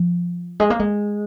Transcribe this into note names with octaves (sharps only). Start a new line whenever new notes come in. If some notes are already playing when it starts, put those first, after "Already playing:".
Already playing: F3
G#3
A#3
G#3